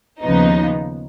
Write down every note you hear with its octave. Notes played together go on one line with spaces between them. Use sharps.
D#2 C#3 F3 B3 D#4